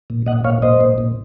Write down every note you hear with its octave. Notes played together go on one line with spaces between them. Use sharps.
A#2
A#2 D#5 F#5
A#2 C#5 F5
A#2 C5 D#5
A#2
A#2